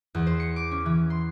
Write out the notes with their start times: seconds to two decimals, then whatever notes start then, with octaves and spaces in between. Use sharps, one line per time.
0.15 E2
0.27 C5
0.40 C#7
0.56 D6
0.71 C#4
0.86 E3
1.10 C6